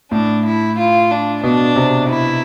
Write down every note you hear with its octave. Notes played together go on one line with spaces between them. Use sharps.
A2 D4
E4
F4
D4
B2 D4
C3
E4